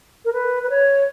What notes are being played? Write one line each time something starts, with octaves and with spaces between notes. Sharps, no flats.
A#4
B4
B4
C#5